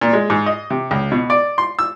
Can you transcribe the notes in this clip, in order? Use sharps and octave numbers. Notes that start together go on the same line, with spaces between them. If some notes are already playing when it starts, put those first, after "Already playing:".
A#2
G#3
G#2
D#5
C3
C#2
B2
D5
C6
E6